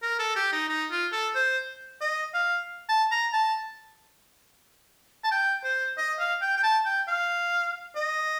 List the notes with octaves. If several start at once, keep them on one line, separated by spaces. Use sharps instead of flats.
A#4
A4
G4
D#4
D#4
F4
A4
C5
D#5
F5
A5
A#5
A5
A5
G5
C5
D#5
F5
G5
G5
A5
G5
F5
D#5